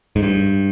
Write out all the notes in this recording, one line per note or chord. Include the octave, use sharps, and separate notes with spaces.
G#2
G2